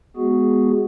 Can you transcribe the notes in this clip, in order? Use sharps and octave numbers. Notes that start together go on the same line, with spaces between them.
G#3 B3 F#4 G#4